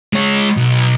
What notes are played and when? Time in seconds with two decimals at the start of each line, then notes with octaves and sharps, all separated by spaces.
0.13 G#3 C#5
0.57 B1